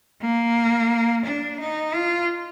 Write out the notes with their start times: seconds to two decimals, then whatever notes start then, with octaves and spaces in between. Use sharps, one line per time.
0.22 A#3
1.25 D4
1.60 D#4
1.94 F4